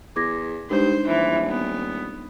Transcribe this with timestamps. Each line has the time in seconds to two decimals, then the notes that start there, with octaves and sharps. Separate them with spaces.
0.16 E2 D6 G#6 A#6
0.70 G2 G#3 D4 D#4 C5
1.07 D#1 E3
1.48 B3